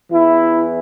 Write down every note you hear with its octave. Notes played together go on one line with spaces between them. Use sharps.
E2 E3 E4